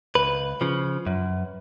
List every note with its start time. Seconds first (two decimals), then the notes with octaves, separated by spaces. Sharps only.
0.15 C#2 B4
0.61 C#3 F3
1.07 F#2